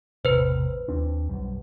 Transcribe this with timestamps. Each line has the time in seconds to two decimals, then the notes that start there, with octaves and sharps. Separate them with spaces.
0.25 E1 A1 C3 B4 C5
0.88 D#2 C4 D4
1.29 B1 F#2 G3